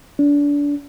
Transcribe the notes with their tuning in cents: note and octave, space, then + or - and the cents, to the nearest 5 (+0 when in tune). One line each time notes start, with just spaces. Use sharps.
D4 -30